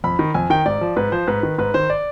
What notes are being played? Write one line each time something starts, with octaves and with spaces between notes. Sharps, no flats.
F2 B5
D#3
F2 G#5
D#3 G5
G#2 D5
F3
G#2 B4
F3 C5
G#2 B4
D#3
G#2 B4
D#3 C5
D5